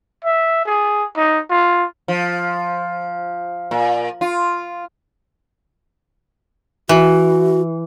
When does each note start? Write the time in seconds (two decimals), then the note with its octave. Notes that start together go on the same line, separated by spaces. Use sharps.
0.25 E5
0.66 G#4
1.16 D#4
1.50 F4
2.08 F3
3.71 A#2
4.21 F4
6.89 E3 F#4